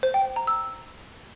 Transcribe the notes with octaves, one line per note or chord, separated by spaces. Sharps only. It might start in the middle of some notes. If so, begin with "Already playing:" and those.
C5
G5
G5
A#5
E6